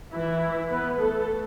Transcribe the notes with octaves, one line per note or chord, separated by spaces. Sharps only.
E3 E4
B3 B4
A3 A4